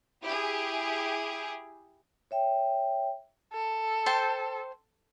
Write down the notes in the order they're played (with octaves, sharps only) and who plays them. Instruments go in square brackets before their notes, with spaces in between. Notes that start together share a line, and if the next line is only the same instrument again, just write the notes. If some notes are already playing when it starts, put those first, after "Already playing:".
[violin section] E4 G4 G#4
[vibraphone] C#5 E5 G5
[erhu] A4
[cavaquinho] C5 G5 A5